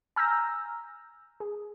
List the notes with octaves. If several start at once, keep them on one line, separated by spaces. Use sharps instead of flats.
G#5 A#5 E6 F6 G6 A#6
G#4